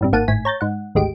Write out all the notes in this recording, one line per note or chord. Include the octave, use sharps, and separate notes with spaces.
A1 G2 C3
G#1 A#3 F#5 A5 D#7
G#1 A2 G#5 B6
C#5 A#5 G6 A6
G#2 F#5
G#1 D2 G#3 G4 D7